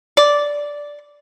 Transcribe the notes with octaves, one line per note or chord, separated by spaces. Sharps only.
D5